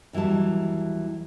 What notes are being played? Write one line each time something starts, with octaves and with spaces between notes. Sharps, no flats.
D#2 E3 F#3 G3 A5